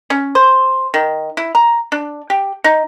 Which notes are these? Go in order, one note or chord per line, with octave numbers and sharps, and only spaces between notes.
C#4
C5
D#3
E4
A#5
D4
G4
D#4